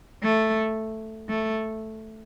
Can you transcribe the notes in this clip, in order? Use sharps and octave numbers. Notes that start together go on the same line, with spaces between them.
A3
A3